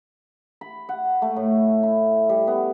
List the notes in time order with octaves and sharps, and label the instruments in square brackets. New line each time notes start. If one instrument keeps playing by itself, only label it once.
[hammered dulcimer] B5
F#5
A3
A2
E4
G3
B3